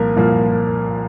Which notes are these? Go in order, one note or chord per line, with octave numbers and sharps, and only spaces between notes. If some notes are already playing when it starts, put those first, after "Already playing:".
Already playing: C2 A#2 F3 A#3 A#4
C2 A#2 F3 A#3